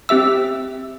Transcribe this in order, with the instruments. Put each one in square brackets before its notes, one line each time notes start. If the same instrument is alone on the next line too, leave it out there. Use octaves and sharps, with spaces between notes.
[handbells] C4 G4 E5 E6